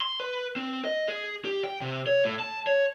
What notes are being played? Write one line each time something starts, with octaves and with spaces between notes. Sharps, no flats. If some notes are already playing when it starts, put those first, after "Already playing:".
C6
B4
C4
D#5
G#4
G4
G5
C3
C#5
A2
A5
C#5